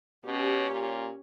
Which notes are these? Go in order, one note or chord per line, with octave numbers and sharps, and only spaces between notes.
B2 C#4 G4 C#5
A#2